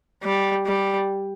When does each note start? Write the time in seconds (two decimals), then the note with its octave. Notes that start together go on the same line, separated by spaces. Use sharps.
0.24 G3
0.66 G3